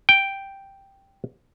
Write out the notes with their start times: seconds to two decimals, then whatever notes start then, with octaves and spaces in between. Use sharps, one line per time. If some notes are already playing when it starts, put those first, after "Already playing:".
0.09 G5